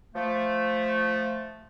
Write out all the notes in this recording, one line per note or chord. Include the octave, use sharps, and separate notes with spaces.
F3 A3